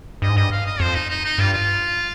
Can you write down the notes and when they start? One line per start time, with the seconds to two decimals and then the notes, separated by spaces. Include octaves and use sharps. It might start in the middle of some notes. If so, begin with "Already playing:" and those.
0.22 G2 D#5
0.29 G#2
0.36 G2 D#5
0.52 F5
0.66 D#5
0.80 F2 C5
0.95 D#4
1.10 D#4
1.25 D#4
1.38 G2 F4
1.53 F4